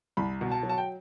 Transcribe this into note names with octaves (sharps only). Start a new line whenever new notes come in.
C2 B5
B2
A5
F#3
A5
G5